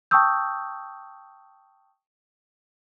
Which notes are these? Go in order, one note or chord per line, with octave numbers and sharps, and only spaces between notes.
G5 A5 C#6 D#6 E6 G6